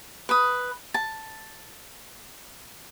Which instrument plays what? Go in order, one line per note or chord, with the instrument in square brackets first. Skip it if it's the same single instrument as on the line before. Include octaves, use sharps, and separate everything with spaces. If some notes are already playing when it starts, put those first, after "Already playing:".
[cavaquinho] B4 D#6
A5